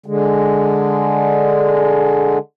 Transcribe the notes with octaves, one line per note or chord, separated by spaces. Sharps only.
D3 G#3